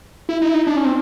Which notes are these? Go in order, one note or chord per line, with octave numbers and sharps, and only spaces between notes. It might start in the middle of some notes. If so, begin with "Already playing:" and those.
E4
D#4
E4
D#4
D4
C#4
C4